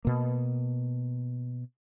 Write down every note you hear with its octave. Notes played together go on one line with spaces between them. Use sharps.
B2 A#3